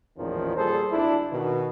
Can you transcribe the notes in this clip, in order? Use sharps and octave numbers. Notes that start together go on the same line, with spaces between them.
A1 E2 A#2 D#3 F3 C#4
A#2 G3 G#4 A4 C5
G#1 D4 E4
B2 D#3